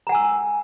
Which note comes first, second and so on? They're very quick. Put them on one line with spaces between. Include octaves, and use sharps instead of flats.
A#5 F#5 G#5 E6